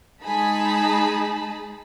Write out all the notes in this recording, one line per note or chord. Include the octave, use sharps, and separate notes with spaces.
G#3 D#4 G#4 A5 B5